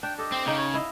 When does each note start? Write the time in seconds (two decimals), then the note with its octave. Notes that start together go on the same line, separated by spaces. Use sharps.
0.03 D4 G5
0.18 G4 A4 D#5
0.32 C4
0.46 C#3 C#4 D#4 G5
0.57 C#5
0.74 E4 D#5 F5